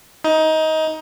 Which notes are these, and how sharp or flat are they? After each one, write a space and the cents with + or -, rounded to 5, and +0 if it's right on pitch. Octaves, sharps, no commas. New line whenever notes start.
D#4 +20